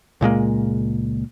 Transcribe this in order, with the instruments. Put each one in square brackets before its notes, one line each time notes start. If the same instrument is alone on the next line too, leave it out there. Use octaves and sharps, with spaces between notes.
[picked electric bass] C#2 A#2 G#3 A#3